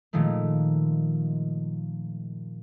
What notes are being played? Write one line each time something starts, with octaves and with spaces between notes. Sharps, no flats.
A#2 D#3 F3 G#3 A3